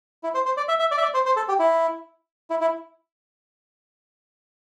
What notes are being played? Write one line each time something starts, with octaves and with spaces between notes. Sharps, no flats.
E4
C5
C5
D5
E5
E5
D5
E5
D5
C5
C5
A4
G4
E4
E4
E4